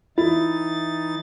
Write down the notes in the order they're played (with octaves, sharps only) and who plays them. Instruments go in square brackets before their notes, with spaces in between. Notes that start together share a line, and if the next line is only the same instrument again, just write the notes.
[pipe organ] E3 D#4 A6 [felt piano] E4